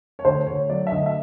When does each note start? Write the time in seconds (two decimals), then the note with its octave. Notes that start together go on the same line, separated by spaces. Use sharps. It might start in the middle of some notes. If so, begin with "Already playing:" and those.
0.19 C#5
0.25 D2 C5
0.47 D2 C#5
0.69 F#3 D5
0.87 E5
0.92 D2 D#5
1.06 E5